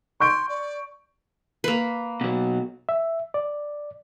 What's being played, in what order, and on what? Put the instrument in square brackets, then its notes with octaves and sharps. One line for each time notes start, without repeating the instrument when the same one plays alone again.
[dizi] C6 [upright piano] C#6 G6 D7
[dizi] D5
[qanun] A#3 B4
[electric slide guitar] B2 F#3
[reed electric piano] E5
D5